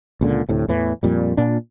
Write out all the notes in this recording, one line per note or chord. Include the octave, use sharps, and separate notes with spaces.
C#2 A#2 D3
D2 A2 C3
E2 A2 E3
F2 A#2 G3
A#2 D4